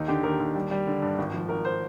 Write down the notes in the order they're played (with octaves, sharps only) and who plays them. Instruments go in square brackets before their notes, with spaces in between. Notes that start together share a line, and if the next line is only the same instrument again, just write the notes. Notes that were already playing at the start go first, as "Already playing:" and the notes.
Already playing: [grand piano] D#2 D#4
D3 G4
D#2 A#4
D#2
G3
G3
D3
G2
G#1
F3
G#1 A#4
C5